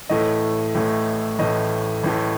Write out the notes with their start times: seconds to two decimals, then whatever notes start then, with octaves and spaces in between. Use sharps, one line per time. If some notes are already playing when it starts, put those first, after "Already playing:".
0.10 A1 A2 A3 D#5
0.75 A1 A2 A3
1.39 A1 A2 A3 D#5
2.04 A1 A2 A3